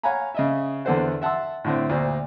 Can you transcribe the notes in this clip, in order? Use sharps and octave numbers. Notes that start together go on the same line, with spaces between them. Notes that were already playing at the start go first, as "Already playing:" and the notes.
C#5 F5 F#5 G#5 A#5 B5
C#3 D#5 E5
E2 D3 A4 B4 C5 F#5
E5 F#5 A5 C6 E6
A2 D3 C4
D2 A#2 C5